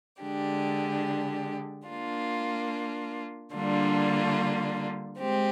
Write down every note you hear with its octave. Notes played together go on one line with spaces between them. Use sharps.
D3 G#3 D4 G4
A#3 D4 F4
D3 G3 A#3 D4 F4
G#3 C4 G4